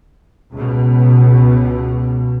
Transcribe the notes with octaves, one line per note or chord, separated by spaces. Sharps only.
C#2 B2